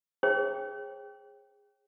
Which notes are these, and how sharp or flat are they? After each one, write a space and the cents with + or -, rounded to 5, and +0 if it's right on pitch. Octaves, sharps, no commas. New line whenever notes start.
G#4 -25 C#5 -40 G5 +0